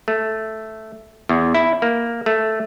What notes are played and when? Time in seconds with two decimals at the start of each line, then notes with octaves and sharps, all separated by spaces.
0.08 A3
1.29 E2
1.55 E4
1.82 A#3
2.26 A3